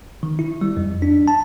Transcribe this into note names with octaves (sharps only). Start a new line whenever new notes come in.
D#3
E4
G3
F2
D4
A5